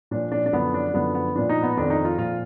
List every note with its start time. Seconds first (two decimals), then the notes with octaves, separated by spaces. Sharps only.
0.11 A#2 F3 D4
0.32 D4
0.46 D4
0.53 F#2 D3 F3 B3
0.74 D4
0.94 F#2 D3 F3 B3
1.15 B3
1.36 A#2 F3 D4
1.49 D#4
1.63 B3
1.77 F2 D#3 D4
1.90 D#4
2.05 F4
2.18 A#2 F3 F4